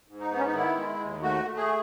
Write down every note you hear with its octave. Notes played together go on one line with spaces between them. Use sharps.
G#2
D#4
B3
C#4
D#4
D#3 E4
G#3
D#2
A3 F#4
A3
G#4